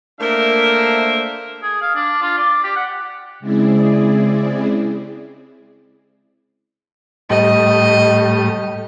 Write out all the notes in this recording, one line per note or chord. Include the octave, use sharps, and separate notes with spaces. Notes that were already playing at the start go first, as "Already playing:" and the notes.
A3 A#3 D4 A#4 C5 E5
G#4
F5
D4
F4
D5
G4
F#5
C#3 G#3 C4 E4 G#4 D5
A2 G3 D#5